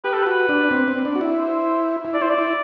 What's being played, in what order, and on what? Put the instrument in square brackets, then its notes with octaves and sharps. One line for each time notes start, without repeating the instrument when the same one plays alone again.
[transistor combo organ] G4 [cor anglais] B4
[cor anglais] A4
[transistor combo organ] F#4 [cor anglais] B4
[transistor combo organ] D4
C4
C4
D4
F#4
E4
[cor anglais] C5
[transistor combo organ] E4
[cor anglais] D5
[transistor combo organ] E4 [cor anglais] C5
[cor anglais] D5
[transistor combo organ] E4